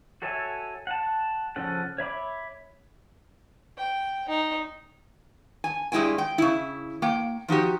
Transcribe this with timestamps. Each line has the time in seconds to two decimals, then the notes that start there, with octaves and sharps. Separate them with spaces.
0.22 F#4 A4 C#5 E5 G#5
0.87 F#5 A5
1.56 C#3 F3 C#4 A4 F#5
1.98 C#5 E5 B5 D6
3.78 G5
4.29 D#4
5.64 G#5
5.92 G2 G3 G#3 E4 G5 G#5
6.18 G5
6.38 C#3 E4
7.02 A#3 G5
7.48 F3 D#4 F#4 G4